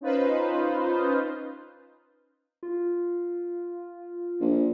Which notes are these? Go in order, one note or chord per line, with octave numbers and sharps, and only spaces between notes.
C#4 D#4 F4 B4 C5
F4
A#1